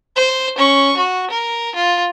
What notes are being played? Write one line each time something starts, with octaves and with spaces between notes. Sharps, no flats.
C5
C#4 C#6
F#4
A#4
F4